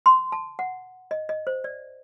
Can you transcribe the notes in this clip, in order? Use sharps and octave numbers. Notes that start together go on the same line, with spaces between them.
C6
A5
F#5
D#5
D#5
C5
D5